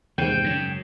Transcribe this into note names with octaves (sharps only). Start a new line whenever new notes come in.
E2 G#2 C3 G5
F#2 C#3